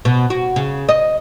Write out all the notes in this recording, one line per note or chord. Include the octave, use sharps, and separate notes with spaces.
B2
F#4
C#3
D#5